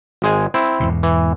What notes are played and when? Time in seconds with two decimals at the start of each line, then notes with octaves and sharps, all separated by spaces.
0.22 G#1 G#3 G#5
0.54 C4 E4
0.80 E2 G#2 B2
1.03 E3